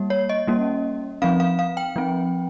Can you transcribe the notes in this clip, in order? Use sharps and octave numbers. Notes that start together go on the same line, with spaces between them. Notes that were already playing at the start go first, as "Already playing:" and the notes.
Already playing: G3 A#3
C#5
D#5
G3 A#3 C#4
F3 C4 F5
F5
F5
G5
F3 C4